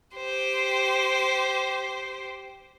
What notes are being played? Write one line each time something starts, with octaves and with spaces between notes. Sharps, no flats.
G4 C5